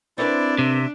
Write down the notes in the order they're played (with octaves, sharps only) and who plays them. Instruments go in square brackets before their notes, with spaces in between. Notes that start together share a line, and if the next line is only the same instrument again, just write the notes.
[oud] C4 A#4 B4 [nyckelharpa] D4 [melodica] E4 D5
[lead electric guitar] C3 [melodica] E5